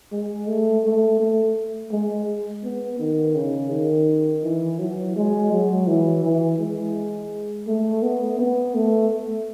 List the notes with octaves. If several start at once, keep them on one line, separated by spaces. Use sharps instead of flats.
G#3
A3
A3
A3
G#3
B3
D#3
C#3
D#3
E3
F#3
G#3
F#3
E3
E3
G#3
A3
B3
B3
A3